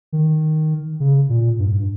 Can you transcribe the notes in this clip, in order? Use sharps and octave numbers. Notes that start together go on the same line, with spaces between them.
D#3
C#3
A#2
G2